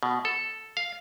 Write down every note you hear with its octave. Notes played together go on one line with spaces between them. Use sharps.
B2
A4
F5